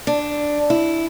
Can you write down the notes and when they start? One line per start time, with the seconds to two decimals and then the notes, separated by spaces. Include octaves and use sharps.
0.07 D4
0.70 E4